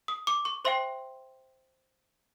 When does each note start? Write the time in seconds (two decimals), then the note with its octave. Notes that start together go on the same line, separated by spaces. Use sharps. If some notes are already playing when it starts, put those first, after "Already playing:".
0.08 D#6
0.27 D6
0.45 C#6
0.65 C5 E5 G5 C6